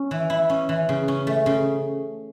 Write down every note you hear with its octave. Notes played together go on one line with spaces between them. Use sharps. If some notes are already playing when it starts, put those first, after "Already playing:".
Already playing: C#4
E3
E4
C#4
E3
C#3
C#4
A3
C#3